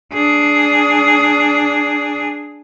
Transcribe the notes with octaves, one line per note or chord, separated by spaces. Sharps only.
D4 G#4